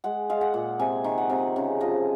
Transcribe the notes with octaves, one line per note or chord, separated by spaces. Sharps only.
G#3 F#5
G#3 F5
F#5
A#2
C3 G#5
D#3
F#5
C3
C#3
F3 D#5